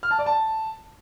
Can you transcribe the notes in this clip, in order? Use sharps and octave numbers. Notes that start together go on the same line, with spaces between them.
F6
A5
D5
A5